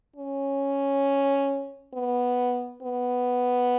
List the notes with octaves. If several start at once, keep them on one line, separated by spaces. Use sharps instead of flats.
C#4
B3
B3